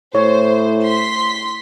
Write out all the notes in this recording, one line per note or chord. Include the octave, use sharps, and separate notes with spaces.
A2 C5 C#5
C6 B6